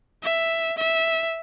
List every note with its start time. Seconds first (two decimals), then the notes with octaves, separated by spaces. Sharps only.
0.23 E5
0.77 E5